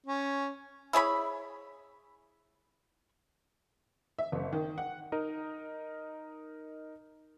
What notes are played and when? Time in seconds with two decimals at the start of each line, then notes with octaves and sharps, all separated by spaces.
0.06 C#4
0.93 E4 G#4 C#5 B5
4.19 E5
4.32 F#1
4.53 D#3
4.78 F#5
5.12 D#4 A#4 D#5